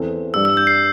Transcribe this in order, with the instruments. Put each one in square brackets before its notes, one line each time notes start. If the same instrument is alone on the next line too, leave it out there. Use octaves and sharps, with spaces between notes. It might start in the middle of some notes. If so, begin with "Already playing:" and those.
Already playing: [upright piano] E2 E3 C4 A4
[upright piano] G2 G3 D4 [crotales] E6
[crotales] E6
G6
C7